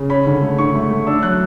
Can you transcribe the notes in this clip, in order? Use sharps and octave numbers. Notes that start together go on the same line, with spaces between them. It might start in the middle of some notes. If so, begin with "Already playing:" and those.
Already playing: C#3
C#4 B5
D3
A3
D3 C#6
A3
A3
D4 E6
F#3 F#6